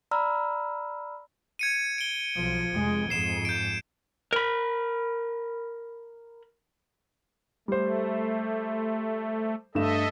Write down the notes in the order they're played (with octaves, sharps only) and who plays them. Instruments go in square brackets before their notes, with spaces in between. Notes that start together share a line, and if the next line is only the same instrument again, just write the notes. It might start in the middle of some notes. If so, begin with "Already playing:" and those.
[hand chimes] D5 A#5 B5 E6 F6
[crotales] G#6 C#7 D#7
D7 G7
[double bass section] B1 F3
F1 G#3
[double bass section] F2 G#2 [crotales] C7 E7
[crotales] G6 D7
[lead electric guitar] A#4 B5
[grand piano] G3 C5 [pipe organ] A3
[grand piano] G2 A3 E7 [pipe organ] A4 D#5 E5